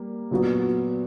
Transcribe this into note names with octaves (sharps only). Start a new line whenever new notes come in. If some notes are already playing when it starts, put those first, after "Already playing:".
Already playing: G3 A#3
A#2 F#3 B3 F#4